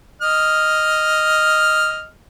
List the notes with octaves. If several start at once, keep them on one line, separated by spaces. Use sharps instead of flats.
D#5 F6